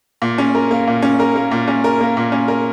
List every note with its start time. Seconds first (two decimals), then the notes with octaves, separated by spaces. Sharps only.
0.22 A#2
0.38 C#4
0.55 A#4
0.71 A#3
0.87 A#2
1.02 C#4
1.20 A#4
1.36 A#3
1.51 A#2
1.68 C#4
1.84 A#4
2.01 A#3
2.17 A#2
2.32 C#4
2.48 A#4